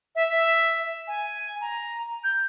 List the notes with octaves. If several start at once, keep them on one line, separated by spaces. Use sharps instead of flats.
E5
G#5
A#5
G6